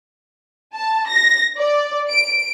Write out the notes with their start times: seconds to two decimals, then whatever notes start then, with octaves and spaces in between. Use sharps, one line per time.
0.75 A5
1.08 A#6
1.58 D5
2.09 D7